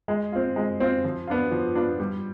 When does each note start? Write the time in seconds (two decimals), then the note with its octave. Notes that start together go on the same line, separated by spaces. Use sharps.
0.08 G#3
0.32 C4 F4
0.56 G#3
0.80 C4 F4
1.04 F3
1.27 B3 D4 F4
1.52 F3
1.75 B3 D4 F4
2.00 G3